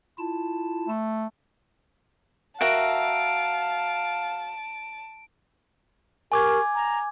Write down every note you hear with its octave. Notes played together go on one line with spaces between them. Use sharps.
E4 F4 A5
A3
F#4 A#4 E5 F5 A5 D7
G4 A#4 G#5 C#6 D6 G#6
A#5